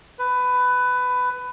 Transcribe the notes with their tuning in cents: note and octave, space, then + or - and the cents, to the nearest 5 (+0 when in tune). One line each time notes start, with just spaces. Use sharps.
B4 +15